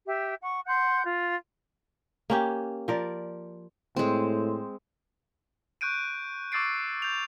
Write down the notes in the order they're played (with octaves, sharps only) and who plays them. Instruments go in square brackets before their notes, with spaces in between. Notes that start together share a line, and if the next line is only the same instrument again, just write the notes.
[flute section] G4 E5
F#5 C#6
F#5 C6 F#6 G6
F4
[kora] A#3 C#4 G4
F3 A#4 D5
[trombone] A2 [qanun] G#3 C4
[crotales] C#6 F#6 G6 D7 D#7
C#6 D6 E6 A6 C7 D7
G6 F7